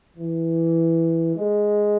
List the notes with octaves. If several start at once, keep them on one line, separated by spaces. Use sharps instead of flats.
E3
G#3